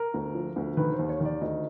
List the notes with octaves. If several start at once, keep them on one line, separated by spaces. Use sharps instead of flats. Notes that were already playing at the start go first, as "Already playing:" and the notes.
Already playing: A#4
D2
F3
D2
D#3 B4
C5
D#2
C#5
D#3
D5
D2 D#5